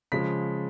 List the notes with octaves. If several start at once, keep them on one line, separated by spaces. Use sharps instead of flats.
C#3 F3 G#3 B6